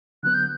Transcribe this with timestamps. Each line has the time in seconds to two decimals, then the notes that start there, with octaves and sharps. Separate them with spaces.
0.23 D3 F#3 B3 F#6
0.34 G6